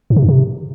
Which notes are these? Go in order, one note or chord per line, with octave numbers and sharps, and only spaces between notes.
G#2
C3
G2
C3